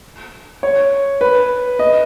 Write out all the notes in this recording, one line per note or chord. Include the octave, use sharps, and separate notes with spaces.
C#5
B4
D#5